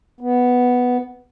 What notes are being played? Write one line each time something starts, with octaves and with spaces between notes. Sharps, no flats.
B3